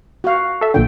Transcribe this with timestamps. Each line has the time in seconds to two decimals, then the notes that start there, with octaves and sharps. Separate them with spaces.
0.24 F#4 F5
0.61 A4 E5
0.74 A#1 A#2 D3 G5